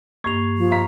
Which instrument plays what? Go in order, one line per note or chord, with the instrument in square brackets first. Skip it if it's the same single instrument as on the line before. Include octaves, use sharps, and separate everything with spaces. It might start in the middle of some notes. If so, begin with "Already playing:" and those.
[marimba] G2 A#3 [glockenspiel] C#6 C7 F7 [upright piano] G#6
[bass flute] F3
[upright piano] F5 A#5 B6